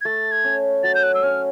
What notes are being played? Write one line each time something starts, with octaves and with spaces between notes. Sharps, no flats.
G#6
A3 A6
G#6
C#4
F#3 A6
G6
F#6
E6
C#4 F6